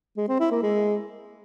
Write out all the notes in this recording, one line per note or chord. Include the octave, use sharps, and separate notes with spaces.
G#3
C4
E4
A#3
G#3